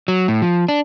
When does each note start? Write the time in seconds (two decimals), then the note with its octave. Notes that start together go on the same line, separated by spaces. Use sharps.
0.08 F#3
0.28 A2
0.42 F3
0.69 D4